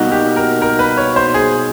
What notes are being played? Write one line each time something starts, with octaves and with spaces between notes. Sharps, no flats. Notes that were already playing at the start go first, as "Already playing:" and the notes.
Already playing: B2 G3 A#3 D#4 F#4
G4
A#4
A#4
B4
C#5
C5
G#4